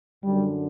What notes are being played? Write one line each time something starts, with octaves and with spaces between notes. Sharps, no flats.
F#2 D3 G3